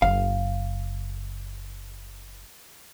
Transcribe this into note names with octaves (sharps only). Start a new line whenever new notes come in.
F#1 F5